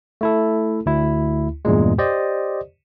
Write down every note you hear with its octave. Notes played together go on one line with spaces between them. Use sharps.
A3 E4 A4
D2 E4
E2 G2 A#2 G#3
G4 C5 D5 D#5